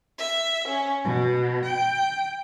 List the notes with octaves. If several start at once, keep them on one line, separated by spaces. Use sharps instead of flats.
E5
C#4
B2
G5